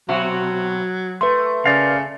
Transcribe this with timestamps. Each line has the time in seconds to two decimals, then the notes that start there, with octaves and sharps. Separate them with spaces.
0.09 B2 F#3 C4 F#4
1.21 A3 B4 C6
1.66 C#3 A#4 D5 F5